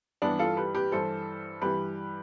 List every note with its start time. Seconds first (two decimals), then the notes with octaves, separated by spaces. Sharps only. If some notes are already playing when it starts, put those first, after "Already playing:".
0.22 G2 E3 B3 D4
0.39 F4 A4
0.57 G4 B4
0.75 G4 B4
0.92 G2 E3 A4 C5
1.62 G2 E3 G4 B4